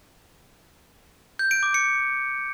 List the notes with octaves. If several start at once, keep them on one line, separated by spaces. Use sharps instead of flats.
G6
D7
D6
C#7